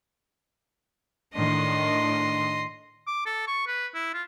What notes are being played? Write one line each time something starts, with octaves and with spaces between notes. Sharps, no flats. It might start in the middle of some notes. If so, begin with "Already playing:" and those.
A2 D#3 D4 D#5 C6
D6
A4
C#6
B4
E4
F4